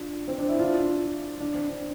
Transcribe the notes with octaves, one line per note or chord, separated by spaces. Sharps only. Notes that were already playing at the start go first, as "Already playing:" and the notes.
Already playing: D4 F4
C4
D4
E4
D4 F4
D4
C4
D4